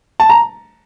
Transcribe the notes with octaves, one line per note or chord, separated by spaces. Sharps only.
A5
A#5